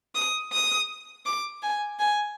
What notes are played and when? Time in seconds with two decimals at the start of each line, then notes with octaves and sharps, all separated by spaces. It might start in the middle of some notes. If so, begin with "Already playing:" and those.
0.15 D#6
0.53 D#6
1.26 D6
1.62 G#5
2.00 G#5